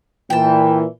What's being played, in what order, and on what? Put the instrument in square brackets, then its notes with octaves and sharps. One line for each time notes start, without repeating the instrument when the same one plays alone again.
[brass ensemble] A#2 E3 [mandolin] G5 A5